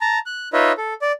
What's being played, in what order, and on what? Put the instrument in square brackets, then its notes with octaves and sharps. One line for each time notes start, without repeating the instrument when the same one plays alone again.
[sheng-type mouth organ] A5 A#5
F#6
D#4 F4 B4 C#5 D#5 E5
A4
D5